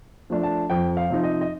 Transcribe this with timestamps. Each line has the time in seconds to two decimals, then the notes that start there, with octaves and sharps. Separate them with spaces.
0.30 F3 A3 D4
0.43 A5
0.70 F2 G5
0.97 F5
1.10 C3 F3 C4 D#4
1.23 D#5
1.41 D#5